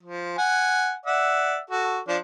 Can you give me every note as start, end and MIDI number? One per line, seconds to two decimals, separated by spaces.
0.03 0.36 53
0.38 0.93 78
0.38 0.93 80
1.06 1.58 74
1.06 1.58 76
1.06 1.58 78
1.71 1.99 66
1.71 1.99 69
2.08 2.17 53
2.08 2.17 62